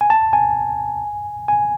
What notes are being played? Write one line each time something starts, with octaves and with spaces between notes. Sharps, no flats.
G#5
A5
G#5
G#5